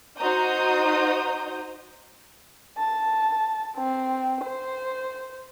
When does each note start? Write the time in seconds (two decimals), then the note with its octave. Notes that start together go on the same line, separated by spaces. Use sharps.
0.18 D#4 F#4 C5 A#5 D#6 G6
2.78 A5
3.77 C4
4.44 C5